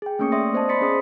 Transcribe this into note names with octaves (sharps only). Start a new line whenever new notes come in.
G#4 G5
A3 A#3 C#4 C#6 D#6 C#7
D5 E5 C6 D#6 A#6
B3 C5 D5 D#5 A5
B5 C6 A6 B6 C#7
C#4 G#4 C5 D#6